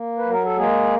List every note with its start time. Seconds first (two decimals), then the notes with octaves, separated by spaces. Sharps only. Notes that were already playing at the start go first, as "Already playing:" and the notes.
Already playing: A#3
0.18 B4
0.25 F#3 A#4
0.44 A4
0.57 G#3 A#3 G#4